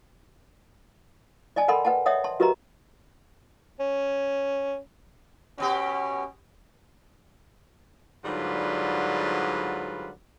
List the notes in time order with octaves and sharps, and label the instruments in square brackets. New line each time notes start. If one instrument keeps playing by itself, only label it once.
[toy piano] D5 D#5 G#5 A5
A4 A#4 F#5 G5 B5 C6
B4 F#5 G5 A5
C#5 D#5 E5 F#5 G5 D#6
A5 C6
F#4 G4 A#4 B4 D#5 A#5
[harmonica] C#4
[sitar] B2 B3 G4 [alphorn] C#4
[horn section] G#2 D3 F#3 G3 F4 B4